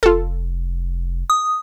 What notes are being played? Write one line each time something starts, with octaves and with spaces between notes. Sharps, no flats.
F1 F4 A4
D#6